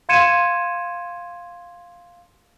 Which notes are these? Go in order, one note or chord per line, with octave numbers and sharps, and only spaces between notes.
F5 C6 G#6 C#7 D#7 E7